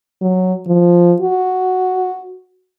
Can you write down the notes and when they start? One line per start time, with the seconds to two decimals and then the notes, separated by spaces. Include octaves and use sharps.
0.21 F#3
0.67 F3
1.21 F#4